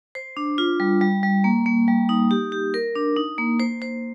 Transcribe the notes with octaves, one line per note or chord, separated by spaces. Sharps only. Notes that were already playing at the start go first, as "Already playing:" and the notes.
C5
D4
F4
G3
G3
G3
A#3
A#3
G3
D#4
G4
G4
A#4
D4
D#4
A#3
C5
C5